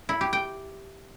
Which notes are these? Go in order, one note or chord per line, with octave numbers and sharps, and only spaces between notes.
E4
G4
G5